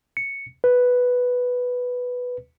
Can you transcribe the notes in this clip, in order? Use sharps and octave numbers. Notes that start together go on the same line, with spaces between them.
C#7
B4